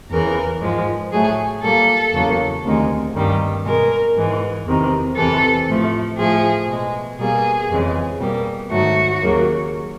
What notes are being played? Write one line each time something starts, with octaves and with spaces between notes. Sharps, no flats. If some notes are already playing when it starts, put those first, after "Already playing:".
E2 C#3 E3 A#4
G#2 F3 G#3
A2 F#3 A3 G#4
A#2 G3 A#3 A4
E2 C#3 F#3 A#3
D2 C3 D#3 G#3
G2 D#3 G3 A#3
B2 G#3 A#4
G#2 E3 G#3
E2 C3 D#3
E2 C3 E3 A4
A2 F3 A3
A2 F3 A3 G#4
B2 G#3
B2 G3 A#3 G#4
F2 C#3 E3 G#3
B2 G3 A#3
G#2 D#3 F#3 A3 F#4
D#2 C#3 F#3 A#3